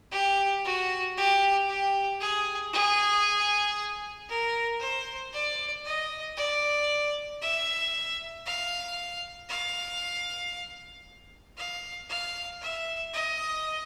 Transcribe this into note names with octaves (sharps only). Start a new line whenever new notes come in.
G4
F#4
G4
G4
G#4
G#4
A#4
C5
D5
D#5
D5
E5
F5
F5
F5
F5
E5
D#5